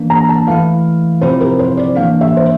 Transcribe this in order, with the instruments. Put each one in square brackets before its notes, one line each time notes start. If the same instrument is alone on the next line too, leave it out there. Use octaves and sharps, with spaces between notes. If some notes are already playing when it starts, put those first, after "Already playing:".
Already playing: [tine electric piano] E3 A#3 D4
[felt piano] A#5
A5
[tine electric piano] E3 A3 E4 [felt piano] F5
[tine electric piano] C3 F3 C4 E4 [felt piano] C5
[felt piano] A#4
C5
D5
[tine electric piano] E3 A#3 D4 [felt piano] F5
[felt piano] E5
C5